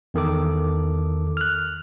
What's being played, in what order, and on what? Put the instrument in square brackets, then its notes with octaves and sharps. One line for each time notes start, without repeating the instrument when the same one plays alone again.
[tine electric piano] E2 D#3 A4 D6
F6 F#6